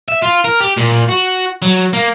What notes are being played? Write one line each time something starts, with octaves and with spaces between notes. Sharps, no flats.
E5
F4
A#4
G4
A#2
F#4
F#3
A#3